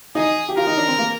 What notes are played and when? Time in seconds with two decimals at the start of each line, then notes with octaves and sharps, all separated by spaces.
0.15 D#4 G#4
0.49 G4
0.57 F4 A#4
0.67 D#4
0.77 D4
0.88 C4
0.99 A#3